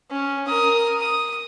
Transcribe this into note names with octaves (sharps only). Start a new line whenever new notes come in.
C#4
A#4 D#6
D#6